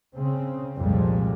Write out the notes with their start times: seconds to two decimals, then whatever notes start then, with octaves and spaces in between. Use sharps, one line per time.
0.14 C#3 C4
0.77 C2 F2 A#2 G3 G#3